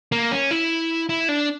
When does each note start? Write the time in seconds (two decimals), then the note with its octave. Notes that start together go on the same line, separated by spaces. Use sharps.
0.12 A#3
0.31 C#4
0.51 E4
1.09 E4
1.29 D4